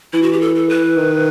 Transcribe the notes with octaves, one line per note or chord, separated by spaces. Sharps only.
E3 E4
F#4
G4
A4
A4
B4
D#3